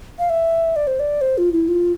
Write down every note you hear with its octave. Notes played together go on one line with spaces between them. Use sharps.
F5
E5
D5
C5
D5
C5
F4
E4
F4